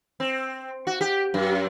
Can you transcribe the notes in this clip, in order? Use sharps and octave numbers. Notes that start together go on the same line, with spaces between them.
C4
F#4
G4
F#2